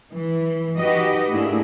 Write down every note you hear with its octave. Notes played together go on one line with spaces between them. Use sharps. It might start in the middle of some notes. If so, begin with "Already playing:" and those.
E3
D#4 F#4 G4 B4 D#5
G#2 A3 A#3 D4 E4 G#4